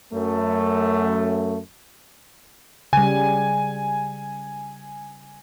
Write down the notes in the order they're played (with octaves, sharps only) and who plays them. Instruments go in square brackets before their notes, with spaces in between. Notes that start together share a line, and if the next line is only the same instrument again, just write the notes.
[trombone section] F#2 A3
[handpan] C#3 G3 [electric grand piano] G#5